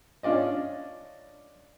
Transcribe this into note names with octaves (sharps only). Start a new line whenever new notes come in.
C#4 D4 F4 D5 D#5